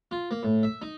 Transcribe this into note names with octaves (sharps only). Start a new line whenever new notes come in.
F4
A#3
A2
E5
D#4